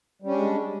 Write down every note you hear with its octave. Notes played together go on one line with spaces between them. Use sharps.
G3 G#3 C#4 D4